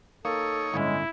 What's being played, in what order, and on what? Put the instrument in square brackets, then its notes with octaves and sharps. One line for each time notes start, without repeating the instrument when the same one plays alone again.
[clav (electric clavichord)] A#3 [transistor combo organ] D#4 C#5 [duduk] A4
[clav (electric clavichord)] G1 A2 C#4 [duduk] G#3 [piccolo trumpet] E4